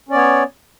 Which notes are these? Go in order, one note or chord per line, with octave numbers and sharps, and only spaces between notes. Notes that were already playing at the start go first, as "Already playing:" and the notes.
B3 C#4 C#5 D5